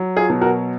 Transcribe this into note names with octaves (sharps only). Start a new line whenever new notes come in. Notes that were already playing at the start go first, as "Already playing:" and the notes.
Already playing: F#3
F4 G#4
B2
F#4 A#4